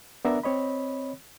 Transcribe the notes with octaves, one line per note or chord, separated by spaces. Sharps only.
B3 D4 A#4 D5 E5 A#5
C4 C#5 D#5 B5